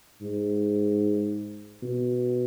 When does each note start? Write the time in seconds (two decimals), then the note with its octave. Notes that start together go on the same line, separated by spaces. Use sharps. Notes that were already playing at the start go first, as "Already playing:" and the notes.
0.22 G#2
1.83 B2